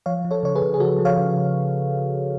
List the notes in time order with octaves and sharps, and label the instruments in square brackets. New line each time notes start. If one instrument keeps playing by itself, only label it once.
[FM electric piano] F3 C#5 F5
F3
A4 C#5
C#3 C#5
G#4 B4
C#3
G#4
F3 F#4 A4
F3
C#5 F5
C#3